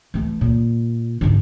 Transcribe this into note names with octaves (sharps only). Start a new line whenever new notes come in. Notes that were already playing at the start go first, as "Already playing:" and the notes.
E3 A3
A#2
G#2 D3